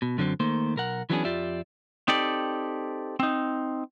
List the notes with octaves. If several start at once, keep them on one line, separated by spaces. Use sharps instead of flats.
B2
F#2 D3 F#3 C4
D#3 A3 A#3 C5
B1 A#4 F#5
E3 F#3 B3 C#4 D4 G#4
F2 F4 G4 D5 E5
C4 D#4 G4 A4 D5
C4 D#4